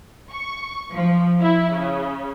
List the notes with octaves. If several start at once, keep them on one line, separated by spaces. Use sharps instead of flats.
C#6
F3
E4
C#3